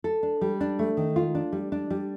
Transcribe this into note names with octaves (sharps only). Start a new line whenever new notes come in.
A4
D4
G3
D4
A3
D#3
F4
D4
G3
D4
G3